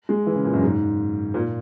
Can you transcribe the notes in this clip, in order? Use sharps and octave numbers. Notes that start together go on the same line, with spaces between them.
G#3
E3
C#3
A#2
F#2
G#2
A#2